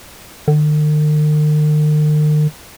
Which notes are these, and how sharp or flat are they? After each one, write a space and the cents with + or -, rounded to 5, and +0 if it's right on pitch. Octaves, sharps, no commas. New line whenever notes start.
D#3 -45